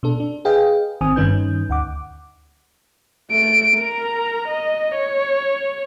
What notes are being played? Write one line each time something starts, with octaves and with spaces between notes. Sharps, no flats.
B2 D4 A4
D4
G#4 B4 D#5 F5 G5
G#1 D#3 C4 G#5 D#6
G2 D#3 C#4 D#4 B4 G6
D2 F#5 D6
A3 D7
A#4 A#5
D#5
C#5